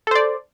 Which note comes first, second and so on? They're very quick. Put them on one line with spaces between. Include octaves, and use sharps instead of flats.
A4 C5 D5